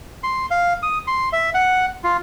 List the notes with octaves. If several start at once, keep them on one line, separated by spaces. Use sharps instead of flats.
C6
F5
D#6
C6
E5
F#5
F4